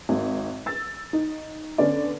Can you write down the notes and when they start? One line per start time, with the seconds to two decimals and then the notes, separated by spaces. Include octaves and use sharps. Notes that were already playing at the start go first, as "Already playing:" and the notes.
0.09 G#1
0.66 E6 A6
1.13 D#4
1.78 D3 B3 C#4 D5